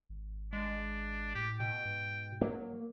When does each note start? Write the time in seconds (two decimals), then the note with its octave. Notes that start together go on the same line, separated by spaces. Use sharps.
0.09 G#1
0.53 G#3 D4
1.35 A2 G4
1.60 B2 G5
1.85 G#2
2.41 F#3 A#3